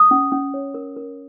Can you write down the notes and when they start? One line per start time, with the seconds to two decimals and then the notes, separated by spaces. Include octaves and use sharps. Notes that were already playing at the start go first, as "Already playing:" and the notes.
Already playing: D#6
0.11 C#4
0.32 C#4
0.54 C#5
0.74 A#4
0.97 A#4